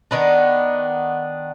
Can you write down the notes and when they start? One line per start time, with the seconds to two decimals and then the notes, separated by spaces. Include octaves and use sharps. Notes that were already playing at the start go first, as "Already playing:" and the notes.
0.11 D#3 B3 D4